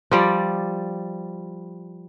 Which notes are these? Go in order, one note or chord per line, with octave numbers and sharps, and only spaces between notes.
F3 G3 D5